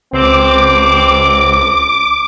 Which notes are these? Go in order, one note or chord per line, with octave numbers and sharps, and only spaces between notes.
C#2 C4 D6